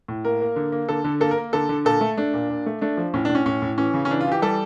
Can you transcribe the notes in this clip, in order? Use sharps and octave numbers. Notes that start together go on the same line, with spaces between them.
A2
A#3 A#4
A#3
D3
A#3
D3 A4
D3
A#3 A4
A#4
A#3
D3 A4
D3
A#2 A4
A3
A3 D4
A#2
A#2
A3
A3 D4
F3
A2 C#4
D4
A2
C#4
A2 C#4
A2
E3 C#4
C#3
C#4
E3 D4
F4
E3 G4
G3 A4